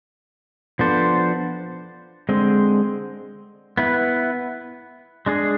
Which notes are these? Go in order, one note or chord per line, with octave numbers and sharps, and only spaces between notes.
F3 B3 D4 A4 C5
D3 G#3 C4
B3 E4 B4
G#3 D4 G#4